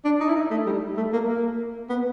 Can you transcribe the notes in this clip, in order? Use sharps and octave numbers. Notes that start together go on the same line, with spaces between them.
D4
D#4
E4
D#4
A3
G3
A3
A#3
A#3
B3